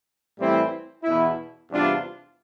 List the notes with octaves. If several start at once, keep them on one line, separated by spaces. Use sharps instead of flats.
A2 E3 G3 C4 E4
E2 B2 B3 E4
E2 C3 G3 D4 F4